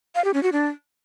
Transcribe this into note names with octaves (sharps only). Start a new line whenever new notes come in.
F5
G4
C#4
F#4
D4